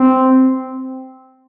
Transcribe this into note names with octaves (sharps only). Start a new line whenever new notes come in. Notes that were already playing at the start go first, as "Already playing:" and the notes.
Already playing: C4